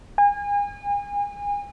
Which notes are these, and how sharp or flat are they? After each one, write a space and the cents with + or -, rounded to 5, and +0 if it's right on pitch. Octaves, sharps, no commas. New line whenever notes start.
G#5 -35